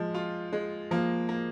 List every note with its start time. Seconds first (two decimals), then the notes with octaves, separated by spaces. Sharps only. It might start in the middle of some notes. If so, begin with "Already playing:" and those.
Already playing: F3 G#3
0.14 F4
0.53 G#3
0.91 F3 A#3
1.29 A#3